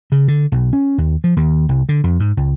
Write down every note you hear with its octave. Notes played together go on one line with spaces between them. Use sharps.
C#3
D3
B1
C#4
D#2
F3
D#2
C2
D3
F2
G#2
C#2